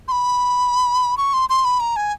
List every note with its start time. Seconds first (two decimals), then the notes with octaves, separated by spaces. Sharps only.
0.08 C6
0.12 B5
1.17 C#6
1.33 C6
1.49 C6
1.65 B5
1.80 A#5
1.96 G#5